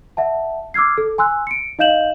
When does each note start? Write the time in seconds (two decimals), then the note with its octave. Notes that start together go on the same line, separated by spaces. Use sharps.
0.17 E5 F#5 A5
0.74 D6 E6 F6 G#6 C7
0.98 A4
1.18 G#5 C6 E6 F#6
1.47 C#7 D7
1.79 D#4 D#5 F5 G6 E7 F#7